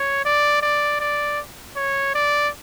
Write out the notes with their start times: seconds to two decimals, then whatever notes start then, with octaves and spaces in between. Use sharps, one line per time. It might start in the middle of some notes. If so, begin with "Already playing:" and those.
Already playing: C#5
0.25 D5
0.62 D5
1.00 D5
1.76 C#5
2.15 D5